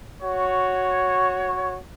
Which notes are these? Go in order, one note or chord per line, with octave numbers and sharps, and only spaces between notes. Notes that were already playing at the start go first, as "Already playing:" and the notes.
F#4 C#5